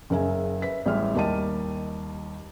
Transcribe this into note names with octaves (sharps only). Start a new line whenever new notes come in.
F#1 C#3 A#4 E5 G#5
B4 E5 B6
A1 G3 G#3 E5 F6
D#2 G3 A#4 D#5 A5 D#7